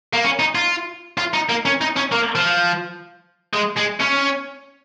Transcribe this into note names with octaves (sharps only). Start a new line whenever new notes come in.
A#3
C#4
D#4
F4
F4
D#4
A#3
C#4
D#4
C#4
A#3
F3
G#3
G#3
C#4